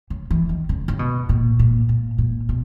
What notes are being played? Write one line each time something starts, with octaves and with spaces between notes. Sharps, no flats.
C#3
E3
D#3
C#3
C#3
B2
A#2
A#2
A#2
A#2
B2